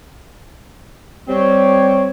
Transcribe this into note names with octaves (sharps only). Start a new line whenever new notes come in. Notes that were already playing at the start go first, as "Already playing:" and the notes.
G3 C4 C#5